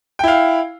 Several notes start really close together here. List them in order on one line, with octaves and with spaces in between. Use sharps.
G5 E4 F5